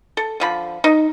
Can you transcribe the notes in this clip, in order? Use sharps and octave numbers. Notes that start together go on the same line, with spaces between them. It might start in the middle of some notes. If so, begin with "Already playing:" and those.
A4
D3 F3 B5
D#4